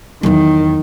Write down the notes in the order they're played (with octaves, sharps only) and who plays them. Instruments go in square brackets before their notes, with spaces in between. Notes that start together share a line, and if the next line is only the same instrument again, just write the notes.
[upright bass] E2 F#3 [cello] D#3